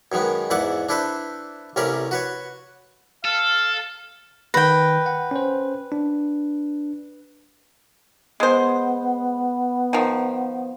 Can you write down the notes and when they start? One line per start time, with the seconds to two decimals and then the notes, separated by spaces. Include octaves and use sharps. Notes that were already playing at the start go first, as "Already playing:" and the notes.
0.12 F#2 D#3 G#3 B3
0.50 E2 G#2 D5 E5 F#5 D6
0.89 D4 E4 A4 B4 C5
1.76 A1 C3 C#4 A#4 D5 B5
2.11 F#4 B4 C#5
3.25 A4 F5
4.54 D#3 B4 G5 A#6
5.06 F#5
5.31 C#4 C5
5.92 D4
8.40 G#3 B3 C5
9.93 D#3 F3